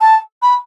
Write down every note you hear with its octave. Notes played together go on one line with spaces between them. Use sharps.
A5
B5